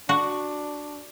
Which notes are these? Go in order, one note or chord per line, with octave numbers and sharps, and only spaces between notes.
D4 F#4